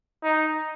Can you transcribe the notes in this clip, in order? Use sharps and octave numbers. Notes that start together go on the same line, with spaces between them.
D#4